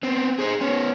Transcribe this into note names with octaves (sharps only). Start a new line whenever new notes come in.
B3 C4
G#4 C5
B3 C#4